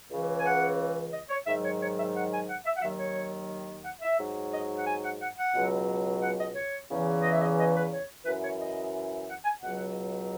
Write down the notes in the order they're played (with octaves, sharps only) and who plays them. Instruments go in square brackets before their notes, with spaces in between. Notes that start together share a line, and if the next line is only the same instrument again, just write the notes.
[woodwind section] C#2 C#3 E3
G#5
F#5
D#5
C#5
G#2 D#3 F#3 E5
C#5
C#5
E5
F#5
G#5
F#5
E5
F#5
D#2 D#3 F#3 E5
C#5
F#5
E5
G#2 F#3
D#5
F#5
G#5
F#5
F#5
F#5
C#2 B2 F#3
F#5
D#5
C#5
E2 C#3 E3
D#5
E5
D#5
D#5
B4
C#5
F#2 E3 B4
C#5
D#5
F#5
G#5
C#2 B2 F#3 F#5